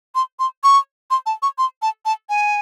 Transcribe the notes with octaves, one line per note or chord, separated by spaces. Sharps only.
C6
C6
C#6
C6
A5
C#6
C6
A5
A5
G#5